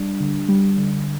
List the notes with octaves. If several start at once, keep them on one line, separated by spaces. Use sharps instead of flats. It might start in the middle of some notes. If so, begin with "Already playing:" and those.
Already playing: G3 D4
D3
G3
D3